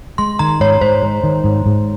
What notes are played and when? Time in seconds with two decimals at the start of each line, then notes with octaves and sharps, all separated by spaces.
0.18 G#3 C6
0.39 D#3 A#5
0.60 G#2 C#5
0.81 G#2 C5
1.02 G#3
1.24 D#3
1.44 G#2
1.66 G#2